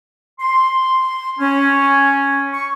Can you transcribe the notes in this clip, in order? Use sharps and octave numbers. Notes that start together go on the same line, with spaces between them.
C6
C#4
C#6